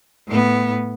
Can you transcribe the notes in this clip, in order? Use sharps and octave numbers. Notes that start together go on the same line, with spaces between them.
A2 B3